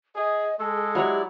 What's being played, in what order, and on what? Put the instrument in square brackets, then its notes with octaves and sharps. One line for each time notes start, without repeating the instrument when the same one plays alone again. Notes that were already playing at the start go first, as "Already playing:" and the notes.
[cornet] G#4 [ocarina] D#5
[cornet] G#3 [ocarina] G#4 [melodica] A4
[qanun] F#3 C#5 [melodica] E4 D5 [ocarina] G4